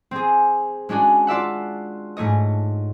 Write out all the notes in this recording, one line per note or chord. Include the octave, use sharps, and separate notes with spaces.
C4 G#4
G#3 C#4 D4 F#4 G#4
F4 D5 E5 F#5
G#2 A3 C#5 D#5